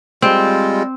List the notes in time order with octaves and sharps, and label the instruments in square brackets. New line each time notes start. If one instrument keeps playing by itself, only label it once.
[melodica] G3 G#3 F4 [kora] C4